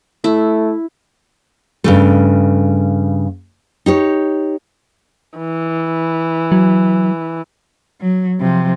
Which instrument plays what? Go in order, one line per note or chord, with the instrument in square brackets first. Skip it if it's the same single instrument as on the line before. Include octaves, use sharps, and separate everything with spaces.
[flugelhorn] A3 [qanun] E4
[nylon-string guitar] G2 C#3 A3
D#4 G4 C#5
[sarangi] E3
[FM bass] F#3
[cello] F#3
C3 F3